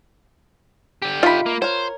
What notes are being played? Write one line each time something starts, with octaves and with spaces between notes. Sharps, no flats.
D3 G4
D#4 F4 E5 B5
A#3
A#4 C5 C#5